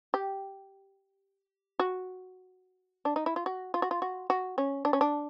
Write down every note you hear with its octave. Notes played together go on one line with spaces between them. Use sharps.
G4
F#4
D4
D#4
E4
F4
F#4
F4
F#4
F4
F#4
F#4
C#4
D4
C#4
D4